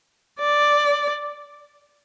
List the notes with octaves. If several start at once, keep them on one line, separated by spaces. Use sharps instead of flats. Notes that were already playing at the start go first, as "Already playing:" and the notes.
D5